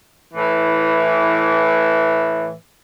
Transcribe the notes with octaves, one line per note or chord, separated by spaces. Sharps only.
A2 E3